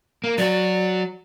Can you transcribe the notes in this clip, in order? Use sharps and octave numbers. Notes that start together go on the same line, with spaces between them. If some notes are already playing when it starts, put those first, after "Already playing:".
A#3
F#3 F#4 D5